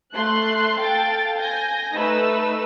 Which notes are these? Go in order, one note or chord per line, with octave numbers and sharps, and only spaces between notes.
A3 C6 F#6
A4 F5 G5 A6 D7
G#5 G6 A#6
A3 D#4 B4 E6